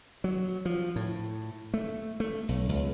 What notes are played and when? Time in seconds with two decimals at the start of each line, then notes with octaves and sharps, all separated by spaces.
0.24 F#3
0.65 F3
0.96 A2
1.74 A3
2.20 A3
2.49 B1
2.69 C#2